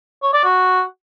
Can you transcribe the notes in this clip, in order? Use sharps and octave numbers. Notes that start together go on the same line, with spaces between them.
C#5
D5
F#4